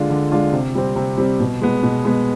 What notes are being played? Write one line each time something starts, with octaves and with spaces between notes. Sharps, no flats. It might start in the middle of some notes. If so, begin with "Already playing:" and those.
Already playing: D3 G#3 D4 F4
D3
G#3 D4 F4
C3
G3 C4
C3
G3 C4
B2
G#3 B3
B2
G#3 B3